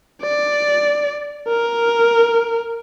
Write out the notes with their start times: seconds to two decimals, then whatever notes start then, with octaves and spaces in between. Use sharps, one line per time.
0.22 D5
1.48 A#4